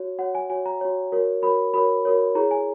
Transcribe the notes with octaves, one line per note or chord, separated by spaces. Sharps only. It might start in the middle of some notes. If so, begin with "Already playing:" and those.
Already playing: F#4 C#5
F#4 C#5 F#5
G#5
F#4 C#5 G#5
A#5
F#4 C#5
F#4 A#4 C#5
F#4 A#4 C#5 B5
F#4 A#4 C#5 B5
F#4 A#4 C#5
E4 G#4 C#5 A#5
G#5